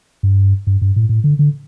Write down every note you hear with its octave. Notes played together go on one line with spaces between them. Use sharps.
G2
G2
G2
A2
A2
D3
D3